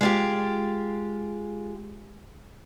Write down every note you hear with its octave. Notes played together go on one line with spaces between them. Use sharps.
G#3 F4 G4